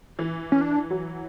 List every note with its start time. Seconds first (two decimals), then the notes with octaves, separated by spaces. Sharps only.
0.19 E3
0.52 C#4
0.61 D4
0.90 F#3